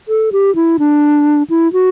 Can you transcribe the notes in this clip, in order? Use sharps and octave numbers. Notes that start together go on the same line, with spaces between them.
A4
G4
E4
D4
E4
F#4